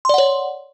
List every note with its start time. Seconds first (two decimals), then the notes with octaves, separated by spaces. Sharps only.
0.05 C6
0.09 D5
0.14 F#5
0.18 C#5